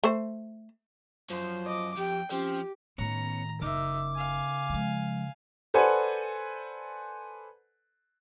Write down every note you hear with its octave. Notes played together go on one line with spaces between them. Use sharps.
A3 C5
F#2 F3 C5
D#5 D6
F2 G4 G5
F3 C4 C#4 G4
A2 D#3 B3 C#4 C#5 A#5
F#1 C#3 D#4 A#4 E5 D6
F5 G#5
F3 G#3
A4 B4 C5 D5 F#5 G#5